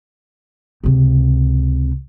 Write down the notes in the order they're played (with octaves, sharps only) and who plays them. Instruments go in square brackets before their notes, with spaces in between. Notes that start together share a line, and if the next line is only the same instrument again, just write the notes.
[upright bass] C#2 C3